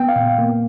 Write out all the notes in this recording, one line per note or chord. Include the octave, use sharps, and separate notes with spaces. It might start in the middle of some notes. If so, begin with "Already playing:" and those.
Already playing: B3 G5
F5
A#2
A#3